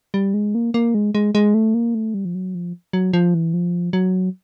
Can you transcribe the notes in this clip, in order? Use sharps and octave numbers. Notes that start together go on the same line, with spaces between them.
G3
G#3
A#3
A#3
G#3
G#3
G#3
A3
A#3
A3
G3
F3
F#3
F3
F#3
F3
E3
F3
F#3